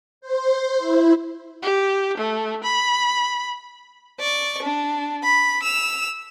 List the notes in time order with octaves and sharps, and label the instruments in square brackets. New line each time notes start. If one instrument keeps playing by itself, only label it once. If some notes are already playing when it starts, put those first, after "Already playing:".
[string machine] C5
E4
[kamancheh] G4
A3
B5
[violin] D5 C#6
D4
B5
E6 F7